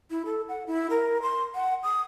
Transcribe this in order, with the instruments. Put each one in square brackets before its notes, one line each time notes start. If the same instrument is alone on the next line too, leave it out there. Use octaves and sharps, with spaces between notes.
[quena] E4
A4
F#5
E4
A#4
C6
F#5
D#6